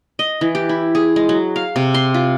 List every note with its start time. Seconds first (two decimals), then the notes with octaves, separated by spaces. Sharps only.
0.19 D#5
0.41 E3
0.55 G4
0.69 E4
0.95 G#4
1.16 G#3
1.29 F#3
1.56 F5
1.76 C3
1.94 C6
2.14 F4